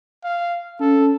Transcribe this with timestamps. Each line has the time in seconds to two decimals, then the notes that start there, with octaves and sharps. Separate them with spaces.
0.24 F5
0.80 C#4 A4